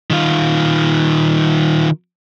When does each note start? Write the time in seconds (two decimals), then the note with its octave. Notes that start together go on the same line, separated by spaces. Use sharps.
0.10 D#3 F4